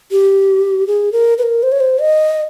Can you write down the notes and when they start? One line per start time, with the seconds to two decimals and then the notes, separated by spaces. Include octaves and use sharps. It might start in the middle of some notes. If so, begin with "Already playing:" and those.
0.11 G4
0.87 G#4
1.12 A#4
1.38 B4
1.43 A#4
1.63 C5
1.72 C#5
1.80 C5
2.01 D#5